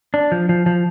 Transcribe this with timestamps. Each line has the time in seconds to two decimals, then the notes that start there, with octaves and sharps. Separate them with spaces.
0.14 D4
0.32 F3
0.49 F3
0.66 F3